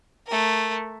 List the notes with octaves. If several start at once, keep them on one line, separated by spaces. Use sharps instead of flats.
A3 A#4